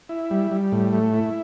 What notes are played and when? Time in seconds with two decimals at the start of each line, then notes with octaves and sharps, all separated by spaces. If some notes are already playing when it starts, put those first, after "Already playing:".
0.09 E4
0.31 G3
0.51 G3
0.72 A2
0.93 A3
1.14 E4